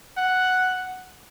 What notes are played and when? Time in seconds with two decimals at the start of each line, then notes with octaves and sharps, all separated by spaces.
0.17 F#5